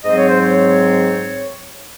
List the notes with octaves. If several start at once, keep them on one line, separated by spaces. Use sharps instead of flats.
G#2 F#3 C4 D#5
C#5
C5
C#5